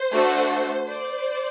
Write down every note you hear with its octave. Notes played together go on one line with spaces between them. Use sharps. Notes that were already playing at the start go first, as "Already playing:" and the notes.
Already playing: C5
A3 D4 F#4 A4
C5 D5